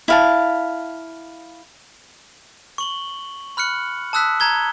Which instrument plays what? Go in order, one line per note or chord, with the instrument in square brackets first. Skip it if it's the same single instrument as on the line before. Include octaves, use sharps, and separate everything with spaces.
[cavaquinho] E4 F5 A5
[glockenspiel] C#6 F#7 G7
B5 F6 F#6 C#7 F#7
A5 D#6 E6 F#6 B6
A5 A#5 G#6 G7